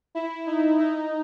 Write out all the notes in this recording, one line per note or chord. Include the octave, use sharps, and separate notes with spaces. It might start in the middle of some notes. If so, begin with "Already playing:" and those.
E4
D#4
D#4